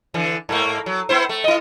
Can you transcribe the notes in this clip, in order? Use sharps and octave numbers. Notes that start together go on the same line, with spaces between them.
D3 E3
G#2 A3 A#3
F#3
B3 E4 C5
A3
E4 D#5